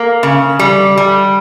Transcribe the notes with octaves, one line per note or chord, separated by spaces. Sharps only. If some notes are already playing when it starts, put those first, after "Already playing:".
Already playing: A#3
C#3
G3
G3